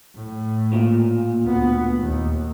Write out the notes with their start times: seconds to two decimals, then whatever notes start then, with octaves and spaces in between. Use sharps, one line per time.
0.15 A2
0.73 A#2
1.42 D2 B3
1.99 D#2